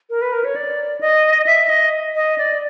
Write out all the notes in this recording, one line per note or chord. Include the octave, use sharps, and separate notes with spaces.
A#4
B4
A#4
C#5
D5
D#5
E5
D#5
D#5
D5